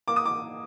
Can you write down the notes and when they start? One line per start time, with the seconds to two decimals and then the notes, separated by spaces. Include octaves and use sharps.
0.08 A#3 D6
0.16 D#6
0.25 D6